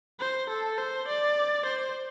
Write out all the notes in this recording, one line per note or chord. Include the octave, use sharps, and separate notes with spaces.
C5
A4
C5
D5
C5